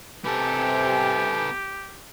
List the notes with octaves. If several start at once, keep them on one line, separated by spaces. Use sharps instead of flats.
C3 B3 G4 A4 G#5